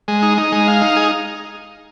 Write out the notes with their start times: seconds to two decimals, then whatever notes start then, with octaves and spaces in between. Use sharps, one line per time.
0.08 G#3
0.22 D#4
0.37 D#4
0.52 G#3
0.67 F5
0.81 D#4
0.96 G#4